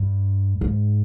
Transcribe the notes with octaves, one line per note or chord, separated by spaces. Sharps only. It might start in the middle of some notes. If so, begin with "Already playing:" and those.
Already playing: G2
G#2